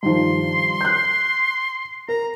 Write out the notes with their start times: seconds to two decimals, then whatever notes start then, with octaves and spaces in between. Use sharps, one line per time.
0.03 G2 D#3 F3 C6
0.81 F#6 G6
2.09 A#4 A#5